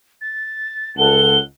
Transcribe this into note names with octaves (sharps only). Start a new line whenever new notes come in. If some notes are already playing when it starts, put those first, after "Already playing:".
A6
C#2 A4 F#5 G7